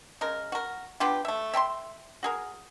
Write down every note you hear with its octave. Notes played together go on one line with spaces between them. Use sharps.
C#3 G#3 A#4
F#4 A#4
B3 D4 F4 G4
A3 E5
E5 G5 A#5 C6
F#4 G#4 A#4